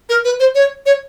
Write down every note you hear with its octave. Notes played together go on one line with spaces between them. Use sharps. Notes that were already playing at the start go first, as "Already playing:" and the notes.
A#4
B4
C5
C#5
C#5